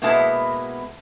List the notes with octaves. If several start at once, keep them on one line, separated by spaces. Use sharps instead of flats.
B2 G#3 A#3 B3 E4 A5